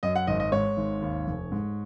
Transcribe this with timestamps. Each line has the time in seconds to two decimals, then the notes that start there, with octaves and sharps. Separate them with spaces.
0.03 F#2 D#5
0.16 F#5
0.27 G#1 D#5
0.40 D#5
0.52 G#2 C#5
0.77 G#1
1.02 D#2
1.27 F1
1.52 G#2